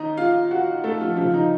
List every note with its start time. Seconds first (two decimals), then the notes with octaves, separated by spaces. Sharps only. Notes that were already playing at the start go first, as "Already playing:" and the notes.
Already playing: D#2 D#3 D#4 D#5
0.17 F4 F5
0.51 F#4 F#5
0.84 A3 A4
1.00 F3 F4
1.16 D#2 C#3 F3 F4
1.33 D#3 D#4